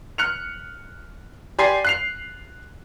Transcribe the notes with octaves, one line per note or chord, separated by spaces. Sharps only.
F6 F#6 C#7 F7
G4 D5 G#5 C6 C7
F#6 C7 F7